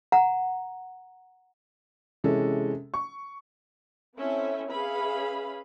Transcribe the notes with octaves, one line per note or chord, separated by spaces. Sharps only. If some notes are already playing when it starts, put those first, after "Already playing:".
F#5 A#5
C3 E3 G#3 C#4 A4
C#6
C4 C#4 E4 A4 E5
C#4 G#4 B4 E5 F5 B5